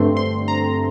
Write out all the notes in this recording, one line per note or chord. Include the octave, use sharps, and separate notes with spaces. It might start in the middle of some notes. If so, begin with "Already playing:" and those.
Already playing: G2 D3 A3 C4 C6
C6
A#5